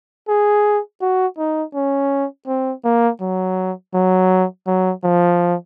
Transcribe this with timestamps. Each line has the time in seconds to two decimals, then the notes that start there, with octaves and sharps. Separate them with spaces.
0.28 G#4
1.01 F#4
1.38 D#4
1.74 C#4
2.47 C4
2.84 A#3
3.21 F#3
3.94 F#3
4.67 F#3
5.04 F3